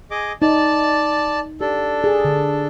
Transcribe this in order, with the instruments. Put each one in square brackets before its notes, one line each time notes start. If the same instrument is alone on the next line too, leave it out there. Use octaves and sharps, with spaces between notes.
[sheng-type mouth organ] G#4 D#5 D6
[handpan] D#4 [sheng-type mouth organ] D5 A5
[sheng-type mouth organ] D4 A4 [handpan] G4
[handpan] G#4
D3